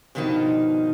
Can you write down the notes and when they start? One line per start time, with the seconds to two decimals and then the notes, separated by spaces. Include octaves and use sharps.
0.15 G2 B2 D#3 F3 D#4